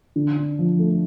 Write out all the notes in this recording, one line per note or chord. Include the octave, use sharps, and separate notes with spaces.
D3
D4
F3
A3